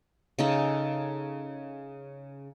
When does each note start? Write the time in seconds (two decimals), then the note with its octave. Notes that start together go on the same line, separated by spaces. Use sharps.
0.39 C#3 D#4 A4